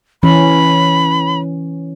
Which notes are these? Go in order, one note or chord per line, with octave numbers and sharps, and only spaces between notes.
E3 C#4 B5